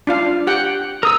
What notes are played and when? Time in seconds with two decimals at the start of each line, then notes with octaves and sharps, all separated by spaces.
0.07 D4 F4 F5
0.47 G4 F#5 G5
1.03 A#4 D#6 E6